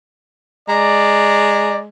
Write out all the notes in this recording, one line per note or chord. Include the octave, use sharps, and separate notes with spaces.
G#3 D5 A#5